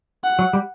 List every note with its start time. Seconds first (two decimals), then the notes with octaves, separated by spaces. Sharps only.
0.24 F#5
0.39 F#3
0.53 G3